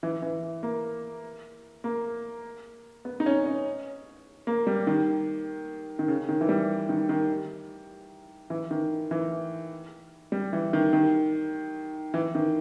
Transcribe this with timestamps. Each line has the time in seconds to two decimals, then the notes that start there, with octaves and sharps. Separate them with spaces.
0.03 E3
0.22 E3
0.63 A#3
1.84 A#3
3.05 B3
3.20 D#4
3.26 C#4
3.45 C#4
4.47 A#3
4.67 G3
4.87 D#3
5.99 D#3
6.08 C#3
6.29 D#3
6.41 E3
6.49 G3
6.89 D#3
7.09 D#3
8.50 E3
8.71 D#3
9.11 E3
10.32 G3
10.53 E3
10.73 D#3
10.93 D#3
12.14 E3
12.35 D#3